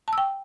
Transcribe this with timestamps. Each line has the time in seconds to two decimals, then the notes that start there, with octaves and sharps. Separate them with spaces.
0.08 A5
0.13 E6
0.18 G5